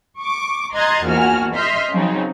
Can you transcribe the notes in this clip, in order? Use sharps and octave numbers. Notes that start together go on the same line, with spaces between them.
C#6 D6
D#5 A#5 C6 F#6 G#6 A6
A#1 E2 A#2 F#4 G#5 F6
D#5 E5 C6 F6 G6 B6
C#3 F3 F#3 C4 D#4